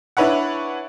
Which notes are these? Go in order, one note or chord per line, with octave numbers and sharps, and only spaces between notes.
D4 E4 B4 C#5 F#5